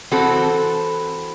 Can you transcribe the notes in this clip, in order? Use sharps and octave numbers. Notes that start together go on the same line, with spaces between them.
E3 C4 F#4 A4